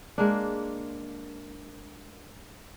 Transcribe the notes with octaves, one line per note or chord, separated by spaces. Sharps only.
G#3 A#3 D4